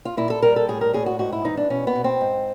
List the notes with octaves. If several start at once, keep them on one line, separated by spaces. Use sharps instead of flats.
F4
A#2 E4
A4
G3 A#4
A4
A2 G#4
A#4
A2 G#4
F#4
G#2 F#4
E4
E3 D#4
D4
B2 C#4
B3
B2
C4
G#2